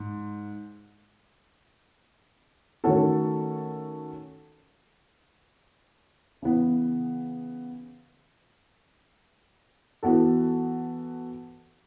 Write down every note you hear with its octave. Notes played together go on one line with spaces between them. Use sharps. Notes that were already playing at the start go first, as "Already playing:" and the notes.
Already playing: G#2
D#3 A3 C#4 F#4 A4
C#3 E3 B3
E3 B3 F#4 A4